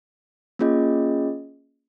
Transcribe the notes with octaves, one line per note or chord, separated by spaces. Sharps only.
A#3 C#4 F4 G#4 D#5